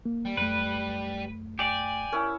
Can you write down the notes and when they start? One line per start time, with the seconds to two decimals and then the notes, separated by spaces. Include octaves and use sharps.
0.06 A#3
0.25 G3
0.37 F#2 A3 B4
1.59 G4 D5 G#5
2.13 C#4 E4 A#4 F6